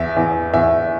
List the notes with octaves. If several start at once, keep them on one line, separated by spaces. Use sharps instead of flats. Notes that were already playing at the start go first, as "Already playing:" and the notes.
Already playing: E2 E5
E2
E2 E5